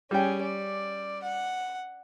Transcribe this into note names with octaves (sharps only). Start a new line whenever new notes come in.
G3 C#4 G#4 G5
D5
F#5